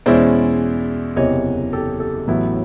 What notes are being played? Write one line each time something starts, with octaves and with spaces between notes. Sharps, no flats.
E2 B2 G#3 C#4 E4 C5 D5
F#1 E2 C3 E3 C#5 D#5
G4 A4
G4 A4
A1 A2 F#3 B3 E4